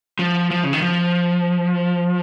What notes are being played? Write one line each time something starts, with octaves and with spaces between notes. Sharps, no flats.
F3
F3
C#3
D#3
F3